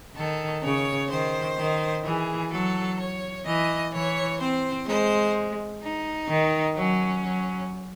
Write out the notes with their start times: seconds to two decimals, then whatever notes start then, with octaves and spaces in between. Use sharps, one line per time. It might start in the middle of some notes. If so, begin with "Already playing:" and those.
0.16 D#3 A4
0.62 C#3 C#5
1.09 D#3 C5
1.57 D#3
2.04 E3 G#4
2.51 F#3 A4
2.98 C#5
3.46 E3 D#5
3.93 E3 C#5
4.40 C4 C5
4.87 G#3 C5
5.81 D#4
6.28 D#3
6.76 F#3 C#4
7.23 F#3